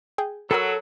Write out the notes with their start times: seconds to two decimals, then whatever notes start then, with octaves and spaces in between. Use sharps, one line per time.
0.18 G#4 G5 G#5
0.51 F#3 A4 A#4 F#5 B5 E6